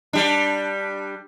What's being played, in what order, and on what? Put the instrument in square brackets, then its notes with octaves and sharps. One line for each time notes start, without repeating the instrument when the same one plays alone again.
[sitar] G3 D4